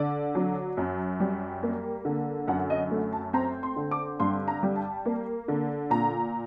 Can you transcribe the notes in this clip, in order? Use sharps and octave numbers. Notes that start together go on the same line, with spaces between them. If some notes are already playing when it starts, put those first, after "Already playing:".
Already playing: D3 D5
F#3
F#2
G3
A#3
D3
F#2 F#5
D#5
A3
A5
C4 A#5
C6
D3
D6
G2 C6
A#5
G3
A5
A#3
D3
A#2 A#5